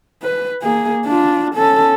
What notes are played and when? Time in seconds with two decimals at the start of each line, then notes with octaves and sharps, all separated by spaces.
0.22 B4
0.62 A#3 G#4
1.05 D4 F4
1.55 C#4 A4